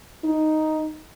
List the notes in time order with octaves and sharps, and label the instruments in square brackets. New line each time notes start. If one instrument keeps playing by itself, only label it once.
[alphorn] D#4